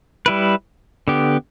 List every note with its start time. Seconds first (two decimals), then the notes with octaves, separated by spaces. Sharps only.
0.26 G3 E4 B4
1.08 D3 B3 G4